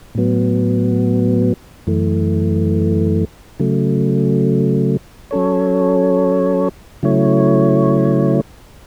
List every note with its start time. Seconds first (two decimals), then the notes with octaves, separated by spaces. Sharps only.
0.15 A2 F#3 B3
1.87 F#2 E3 A3
3.59 C#3 F#3 A3
5.31 F#3 C#4 A4 C#5
7.03 C#3 F#3 A3 E4 C#5